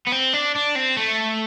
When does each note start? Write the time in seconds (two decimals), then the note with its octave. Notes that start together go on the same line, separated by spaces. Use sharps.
0.07 B3
0.12 C4
0.33 D4
0.55 D4
0.75 C4
0.96 A3